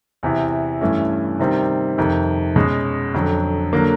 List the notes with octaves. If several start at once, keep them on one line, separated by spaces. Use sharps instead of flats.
E2 C3 E3
G2 E3 A3 C#4
C3 D#3 G3 C4
F2 C3 D#3
B2 G#3 C#4
F2 D3 F#3
D3 F#3 A#3